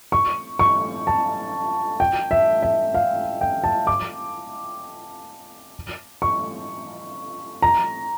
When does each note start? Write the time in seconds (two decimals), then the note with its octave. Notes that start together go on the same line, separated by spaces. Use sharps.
0.12 C#6
0.59 C#6
1.07 A5
2.00 G5
2.31 E5
2.63 E5
2.94 F5
3.41 G5
3.64 A5
3.87 D6
6.22 C#6
7.62 A#5